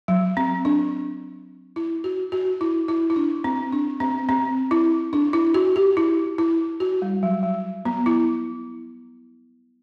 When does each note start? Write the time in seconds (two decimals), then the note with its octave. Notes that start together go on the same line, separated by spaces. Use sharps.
0.08 F#3
0.37 C4
0.65 D4
1.76 E4
2.04 F#4
2.32 F#4
2.61 E4
2.88 E4
3.10 E4
3.16 D4
3.44 C4
3.72 D4
4.00 C4
4.29 C4
4.71 E4
5.13 D4
5.33 E4
5.54 F#4
5.76 G4
5.97 E4
6.38 E4
6.80 F#4
7.02 G3
7.23 F#3
7.43 F#3
7.85 B3
8.06 E4